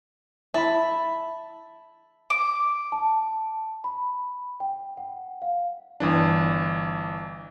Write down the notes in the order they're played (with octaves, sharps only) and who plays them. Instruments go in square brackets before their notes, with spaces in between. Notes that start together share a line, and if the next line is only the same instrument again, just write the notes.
[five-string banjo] E4 [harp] A5 B5
[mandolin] D6
[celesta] A5
B5
G5
F#5
F5
[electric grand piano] G1 E3 D4